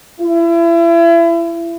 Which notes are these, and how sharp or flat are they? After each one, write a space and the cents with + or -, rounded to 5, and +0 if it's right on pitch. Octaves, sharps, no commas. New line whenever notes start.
E4 +35